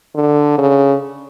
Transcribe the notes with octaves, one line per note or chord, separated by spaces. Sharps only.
D3
C#3